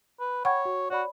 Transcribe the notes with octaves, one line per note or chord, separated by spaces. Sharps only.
B4
C#5 F#5 G5 B5 C#6 G#6
F#4
F#4 C#5 D5 B5